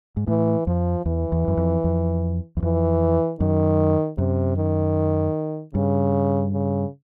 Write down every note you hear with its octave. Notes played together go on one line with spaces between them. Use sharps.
G#2
A2 E3
F2 F3
E2 E3
E2
F#2
F2
F2
E2
F2 E3
F#2 D#3
F#2 C3
D#3
G2 C#3
C#3